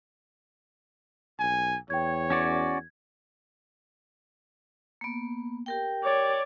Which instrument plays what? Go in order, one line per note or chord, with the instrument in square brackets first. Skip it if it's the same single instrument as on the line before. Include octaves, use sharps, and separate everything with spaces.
[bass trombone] B1 [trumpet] G#5
[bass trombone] E2 [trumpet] C#5 [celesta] G5 G#6
[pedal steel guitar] C#4 F#4 D5 [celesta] G#6
[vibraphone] A#3 B3
G4 A#4 G5
[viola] C#5 D5